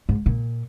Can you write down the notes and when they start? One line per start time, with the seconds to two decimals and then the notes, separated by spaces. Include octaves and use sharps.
0.09 G#2
0.26 A#2